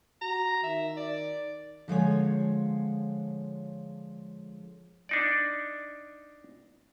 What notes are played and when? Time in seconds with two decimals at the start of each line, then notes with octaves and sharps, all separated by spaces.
0.21 F#4 A#5
0.63 D#3 E5
0.97 D5
1.88 D3 F3 G#3 C#5
5.09 D4 D#4 D5